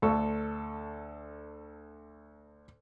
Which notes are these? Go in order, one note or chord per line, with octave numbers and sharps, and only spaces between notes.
D2 A4 C#6